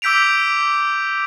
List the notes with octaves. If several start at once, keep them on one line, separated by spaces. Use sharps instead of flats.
D6 E6 G6 B6 D7 F7